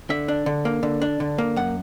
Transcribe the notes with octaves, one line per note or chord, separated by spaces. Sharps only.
D3 E5
D4
D3
A#3
D3
D4
D3
A#3
F#2 F#5